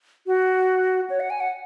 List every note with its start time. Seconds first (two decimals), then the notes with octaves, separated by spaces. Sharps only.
0.27 F#4
1.10 C#5
1.20 F#5
1.30 G#5
1.40 F#5